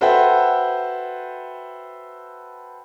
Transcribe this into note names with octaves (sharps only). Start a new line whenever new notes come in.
F#4 A4 B4 C5 E5 G5